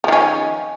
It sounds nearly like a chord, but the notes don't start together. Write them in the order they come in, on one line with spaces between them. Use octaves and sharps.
F3 D#3 C#4